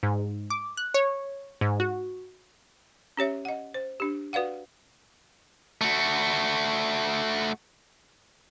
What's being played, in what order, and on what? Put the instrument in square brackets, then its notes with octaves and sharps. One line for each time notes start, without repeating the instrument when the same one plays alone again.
[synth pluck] G#2
D6
F#6
C#5
G#2
F#4
[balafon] C#4 G4 C#5 E5
D#5 F#5
C5
D4 G4
F#4 B4 D5 F5 F#5
[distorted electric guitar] A3 F#4